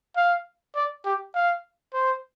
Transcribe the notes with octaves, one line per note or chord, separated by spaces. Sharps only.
F5
D5
G4
F5
C5